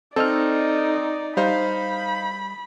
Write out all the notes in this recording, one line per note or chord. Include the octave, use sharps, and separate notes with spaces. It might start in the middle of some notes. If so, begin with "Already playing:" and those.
C4 D#4 A4 D5 D#5 F6
G3 D#4 C5 F5 B5